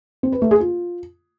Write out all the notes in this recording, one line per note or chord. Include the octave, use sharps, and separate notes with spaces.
C4
B4
A3
G#4
F4